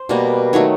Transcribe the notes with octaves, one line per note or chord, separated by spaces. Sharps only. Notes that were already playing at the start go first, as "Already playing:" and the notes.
Already playing: C5
B2 G3 A#3
D#3 F#3 A3 C#5